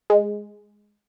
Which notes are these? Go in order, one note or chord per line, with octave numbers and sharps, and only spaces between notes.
G#3